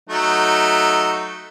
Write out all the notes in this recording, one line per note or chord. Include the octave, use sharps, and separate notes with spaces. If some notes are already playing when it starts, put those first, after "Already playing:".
F#3 A3 D#4